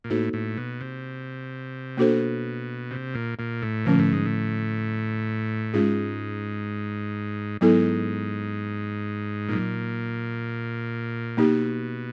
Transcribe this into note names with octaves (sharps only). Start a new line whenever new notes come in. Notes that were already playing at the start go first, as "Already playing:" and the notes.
A#2
A2 A#3 D#4 F#4 A4 C5
A2
B2
C3
B2 A#3 D4 F#4 A4 C5
C3
A#2
A#2
A2
A#2 D3 F3 A3 C#4
A2
G#2
A2
G#2 G#3 C#4 F4 G#4
G#2 F#3 B3 E4 A4
A#2 F#3 A#3 D#4
B2 A#3 D#4 G4